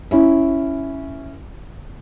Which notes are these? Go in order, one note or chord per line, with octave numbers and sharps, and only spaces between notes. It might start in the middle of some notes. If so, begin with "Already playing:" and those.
C#4 E4